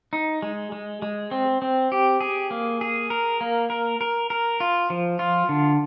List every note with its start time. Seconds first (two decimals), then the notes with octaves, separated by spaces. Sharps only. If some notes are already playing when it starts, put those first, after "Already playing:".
0.13 D#4
0.42 G#3
0.72 G#3
1.02 G#3
1.31 C4
1.62 C4
1.92 G4
2.21 G#4
2.51 A#3
2.81 G#4
3.10 A#4
3.41 A#3
3.70 A#4
4.01 A#4
4.30 A#4
4.60 F4
4.90 F3
5.19 F4
5.49 D3